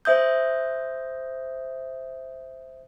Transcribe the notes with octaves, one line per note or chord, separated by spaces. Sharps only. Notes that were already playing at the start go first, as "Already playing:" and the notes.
C5 E5 D#6 G6